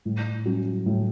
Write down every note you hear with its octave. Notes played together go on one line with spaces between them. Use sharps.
A2
F#3 C#4
A2